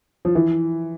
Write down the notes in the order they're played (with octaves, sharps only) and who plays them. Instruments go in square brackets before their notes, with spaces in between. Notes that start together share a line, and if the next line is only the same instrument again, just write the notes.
[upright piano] F3
E3